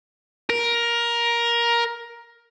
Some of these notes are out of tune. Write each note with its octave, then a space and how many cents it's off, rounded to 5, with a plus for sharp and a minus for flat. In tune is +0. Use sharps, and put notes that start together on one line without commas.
A#4 +15